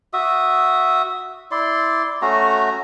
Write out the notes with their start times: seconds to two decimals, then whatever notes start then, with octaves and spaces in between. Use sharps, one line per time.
0.13 F#4 E5 D#6
1.51 E4 D5 C6
2.22 A3 C#4 F#4 A#5